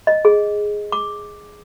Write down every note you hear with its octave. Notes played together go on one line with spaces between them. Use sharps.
D#5
G#4
D6